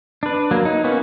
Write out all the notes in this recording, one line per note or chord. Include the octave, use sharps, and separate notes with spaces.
D4 B4
F#3 A#3
D#4
A#3 B3 C#4